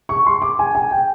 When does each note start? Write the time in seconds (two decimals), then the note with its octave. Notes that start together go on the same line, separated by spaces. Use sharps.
0.09 C#6
0.26 C6
0.42 D6
0.59 G#5
0.75 G#5
0.91 G5